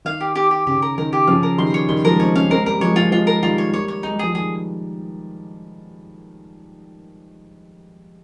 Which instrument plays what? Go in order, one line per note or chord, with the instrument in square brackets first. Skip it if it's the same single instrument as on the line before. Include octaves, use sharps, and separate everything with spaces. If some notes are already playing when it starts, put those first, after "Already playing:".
[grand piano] D#3 [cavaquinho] F5
[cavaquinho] G4
G4
G4
[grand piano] C#3 [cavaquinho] G4
[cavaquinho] A#4
[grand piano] D#3 [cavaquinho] A#4
[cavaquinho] G4
[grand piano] C#3 F3 [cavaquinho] F5
[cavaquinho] A#4
[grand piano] D#3 G3 [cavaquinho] C6
[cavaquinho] C#5
[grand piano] D#3 G3 [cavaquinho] C6
[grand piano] F3 G#3 [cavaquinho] A#4
[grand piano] C4 D#4 [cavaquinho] C#5
[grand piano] A#3 C#4 [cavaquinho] F5
[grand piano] G#3 C4 [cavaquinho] A#4
[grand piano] G3 A#3 [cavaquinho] A#4
[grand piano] F3 G#3 [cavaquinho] C#5
[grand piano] F3 G#3 [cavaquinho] F4
[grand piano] F3 G#3 [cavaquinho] F4
[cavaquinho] A#4
[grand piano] D#3 G3 [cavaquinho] F4
[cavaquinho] C#5
[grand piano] G3 A#3 [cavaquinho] C#5
[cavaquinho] C#5
[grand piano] G#3 [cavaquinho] D#4
[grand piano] G3
[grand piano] F3 G#3 [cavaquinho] G#4
[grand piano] D#3 G3 [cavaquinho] G#4